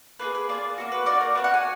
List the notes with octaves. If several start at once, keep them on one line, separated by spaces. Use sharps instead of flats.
A#3 F4 G#4 B4
B4
A#3 F4 G#4 D5
A#3 D#4 F#4
B4
A#3 D#4 F#4 D5
A#4
D4 F#4 B4
F#5
G#5